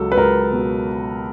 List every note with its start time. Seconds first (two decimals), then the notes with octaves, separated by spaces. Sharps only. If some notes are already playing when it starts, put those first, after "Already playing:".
Already playing: C#2 F#3 A4
0.12 B4
0.17 C#2 A#4
0.53 B2